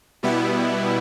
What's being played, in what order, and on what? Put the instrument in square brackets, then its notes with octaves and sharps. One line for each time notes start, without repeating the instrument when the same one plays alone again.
[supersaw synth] B2 G3 B3 E4